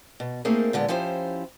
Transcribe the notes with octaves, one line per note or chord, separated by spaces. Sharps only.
B2
A3 A#3 C4 D#4 G#4 A#4
A#2 D3 G#3 B3
F3 C#4 E4 G4 C5